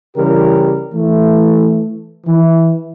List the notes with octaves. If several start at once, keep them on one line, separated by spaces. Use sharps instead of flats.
C#3 E3 G3 G4 A#4
E3 A3
E3